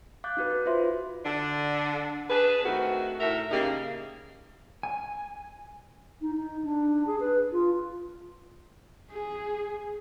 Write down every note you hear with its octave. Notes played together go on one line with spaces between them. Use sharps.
F5 D6 F#6 G6 A6
D#4 F#4 B4
F#4
F4 B4 C5 E5 C6
D3 D4
D4 G#4 B4
D#3 A3 C4 F#4
A2 A4 A#4 E5
C#3 A#3 D#4 G4 G#4
G#5
D#4
D#4
D4
G#4
B4
F4
G#4